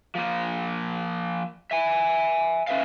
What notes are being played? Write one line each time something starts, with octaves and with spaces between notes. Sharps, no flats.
F3 A#3
E5 G#5
C#4 B4 E5 F5